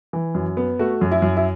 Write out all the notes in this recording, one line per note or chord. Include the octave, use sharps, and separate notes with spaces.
E3
F#2
B3
A3 F#4
F#2
E4
F#2
E4